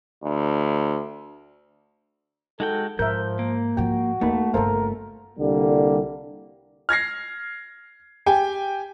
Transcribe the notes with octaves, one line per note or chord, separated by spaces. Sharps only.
D2
G#3 D#4 F#4 A4 G5
G#2 F3 A#4 E5 G6
A#3
G#2 F3 F#4 G5
E2 A3 A#3 D#4 B5
G1 C#3 A4 A#4 C5 F5
C2 D3 G3 A#3
F6 G#6 A#6 C7
G4 G5 G#5